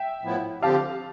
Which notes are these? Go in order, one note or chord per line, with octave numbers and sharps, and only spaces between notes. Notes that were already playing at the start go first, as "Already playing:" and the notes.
Already playing: E5 G5
A2 F3 B3 E4
D3 F3 C4 G4 F5 A5